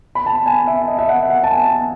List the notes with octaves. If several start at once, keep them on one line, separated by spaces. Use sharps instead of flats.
B5
A5
G#5
E5
D#5
E5
F#5
F#5
A5
G#5